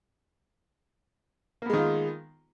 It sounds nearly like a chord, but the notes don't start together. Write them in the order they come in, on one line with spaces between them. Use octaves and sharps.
A#3 B3 G#3 D#3 F4